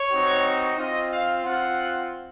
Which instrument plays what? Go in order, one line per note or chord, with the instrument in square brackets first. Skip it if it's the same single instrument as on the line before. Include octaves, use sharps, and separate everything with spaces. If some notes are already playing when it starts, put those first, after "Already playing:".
Already playing: [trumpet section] C#5
C4 D#4 F#4
C4 F4 D#5
F5
C4 F4 F#5